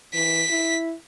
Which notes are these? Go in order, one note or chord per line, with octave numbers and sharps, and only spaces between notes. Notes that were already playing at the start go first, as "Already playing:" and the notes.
E3 B6
E4